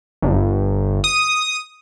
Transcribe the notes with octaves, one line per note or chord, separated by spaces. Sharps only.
G1
D#6